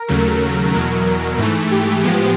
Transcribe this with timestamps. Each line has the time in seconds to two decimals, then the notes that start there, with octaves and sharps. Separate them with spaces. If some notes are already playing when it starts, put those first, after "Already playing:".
Already playing: A#4
0.08 D#2 C#3 F#3 A3
0.73 E2 B2 F#3
1.38 G#2 E3 A3
1.71 G4
2.04 A2 F3 G#3 B3 G4